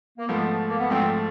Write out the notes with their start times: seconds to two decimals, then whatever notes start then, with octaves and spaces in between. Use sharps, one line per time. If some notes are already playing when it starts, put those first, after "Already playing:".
0.18 A#3
0.28 G#2 F3 A3 B3
0.68 A#3
0.79 B3
0.90 G#2 F3 A3 C4